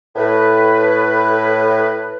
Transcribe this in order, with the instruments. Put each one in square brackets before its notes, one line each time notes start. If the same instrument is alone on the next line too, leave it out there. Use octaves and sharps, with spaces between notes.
[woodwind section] A2 B4